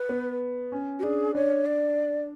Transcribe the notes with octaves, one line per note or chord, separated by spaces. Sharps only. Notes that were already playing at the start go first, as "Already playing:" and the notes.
Already playing: B4
B3
C#4
F#4
D4 G#4
D4 C#5
D5